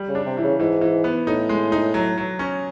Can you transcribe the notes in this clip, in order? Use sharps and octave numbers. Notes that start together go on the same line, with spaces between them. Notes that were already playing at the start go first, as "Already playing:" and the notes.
Already playing: G3
C#3
D4
C3
E3
C#3
G#2 E3
E3
B3
A2 D#4
G#3
D#4
F#3
F#3
C#4